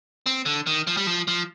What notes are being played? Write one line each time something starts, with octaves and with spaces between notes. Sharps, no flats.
C4
D3
D#3
F3
G3
F3
F3